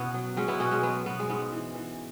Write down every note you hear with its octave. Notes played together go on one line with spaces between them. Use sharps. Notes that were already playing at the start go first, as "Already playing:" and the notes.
Already playing: B2 B3 C#4 E4 F#4
F#3
F#3 G#3 C#4
B3 E4
B2 C#4 F#4
G#3 C#4
F#3 B3
B2 B3
G#3
G#2 B3
E3
E3